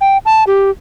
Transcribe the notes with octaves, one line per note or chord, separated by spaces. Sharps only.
G5
A5
G4